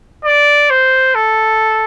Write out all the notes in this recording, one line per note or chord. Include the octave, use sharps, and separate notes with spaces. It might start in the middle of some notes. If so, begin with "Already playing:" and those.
D5
C5
A4